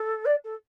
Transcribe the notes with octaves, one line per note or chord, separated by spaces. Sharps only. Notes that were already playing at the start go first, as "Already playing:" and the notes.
Already playing: A4
D5
A4